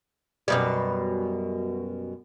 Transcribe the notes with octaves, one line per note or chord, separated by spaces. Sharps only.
F#2 B2 G3